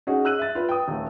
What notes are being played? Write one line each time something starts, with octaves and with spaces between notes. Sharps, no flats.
C#4 D#4 F#4 G#4
E6 F#6 D#7 F#7
E5 A6
F4 B4
G5 D#6
D#1 A3